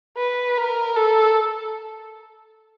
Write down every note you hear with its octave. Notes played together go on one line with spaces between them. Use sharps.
B4
A#4
A4